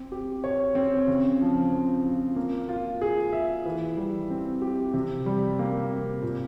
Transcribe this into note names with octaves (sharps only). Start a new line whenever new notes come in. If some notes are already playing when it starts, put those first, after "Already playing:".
Already playing: C4
G4
C#5
C4
C#3
F3
C4
F4
A#3
F4
G#4
E5
E3
G3
C4
G4
C3
G3
A#3
C3
A#2